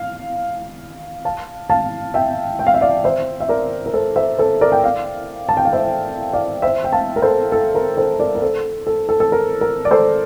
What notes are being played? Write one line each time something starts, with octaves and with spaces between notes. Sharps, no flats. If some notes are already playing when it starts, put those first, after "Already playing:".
Already playing: F5
F5 A5
F5 A5
E5 G5
G5
F5
E5
D5 F5
C5 E5
E5
A#4 D5
A#4
A4 C5
C5 E5
A4 C5
A#4 D5
G5
D5 F5
A5
G5
F5
C5 E5
D5 F5
C5 E5
G5
F5 A5
A#4
A4 C5
A4
A#4
A4 C5
A#4 D5
A#4
A4 C5
A4
A4
A4
A#4
A#4
D5
A4 C5